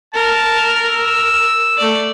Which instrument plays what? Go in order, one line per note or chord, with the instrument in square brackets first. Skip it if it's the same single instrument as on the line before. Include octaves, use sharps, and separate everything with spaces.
[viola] A#4 [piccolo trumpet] A5
[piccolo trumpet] E6
[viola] A3 D5